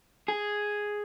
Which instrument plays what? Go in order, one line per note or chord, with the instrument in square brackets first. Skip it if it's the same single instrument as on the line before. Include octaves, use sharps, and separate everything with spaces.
[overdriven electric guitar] G#4